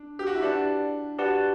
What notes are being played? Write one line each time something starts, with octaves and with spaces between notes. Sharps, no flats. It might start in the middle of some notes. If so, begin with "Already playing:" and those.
Already playing: D4
G4
F#4
E4
D4 G4 B4 D5 F#5 A5
F#4 G4 B4 D5 F#5 A5